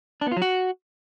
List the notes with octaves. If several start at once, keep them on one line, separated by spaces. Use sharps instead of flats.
D4
B3
F4
F#3
F#4